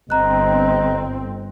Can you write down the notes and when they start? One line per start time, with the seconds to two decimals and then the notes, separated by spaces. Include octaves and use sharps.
0.10 G1 C4 D#5 A#5 F#6